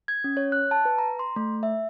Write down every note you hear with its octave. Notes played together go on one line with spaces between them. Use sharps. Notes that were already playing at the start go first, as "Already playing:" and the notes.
G#6
C#4
C#5
F#6
A5
B4
A#5
C6
A3
E5